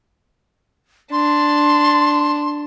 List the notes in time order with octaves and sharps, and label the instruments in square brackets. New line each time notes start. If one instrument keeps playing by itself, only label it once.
[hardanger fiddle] D4 [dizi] C6